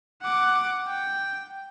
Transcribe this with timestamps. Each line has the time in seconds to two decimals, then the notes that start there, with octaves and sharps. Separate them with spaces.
0.23 F#5 D6
0.87 G5